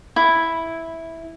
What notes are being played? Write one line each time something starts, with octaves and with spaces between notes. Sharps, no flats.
E4